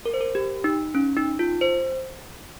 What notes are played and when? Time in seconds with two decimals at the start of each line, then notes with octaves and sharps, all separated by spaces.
0.06 A#4
0.14 C5
0.21 A#4
0.35 G4
0.64 D#4
0.95 C#4
1.16 D#4
1.39 F4
1.61 C5